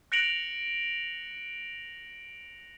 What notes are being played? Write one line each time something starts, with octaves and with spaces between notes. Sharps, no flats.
F#6 A#6 C#7 D7 F7 F#7